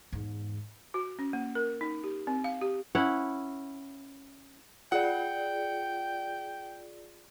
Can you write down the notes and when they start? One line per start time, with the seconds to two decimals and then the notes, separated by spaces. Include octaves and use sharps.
0.12 E2 G#2
0.94 F#4
1.19 C#4
1.33 A#3
1.55 A#4
1.81 D#4
2.04 G4
2.27 C4
2.44 F5
2.61 G4
2.95 C#4 E4 F#5
4.92 F4 G#4 D5 F#5 G5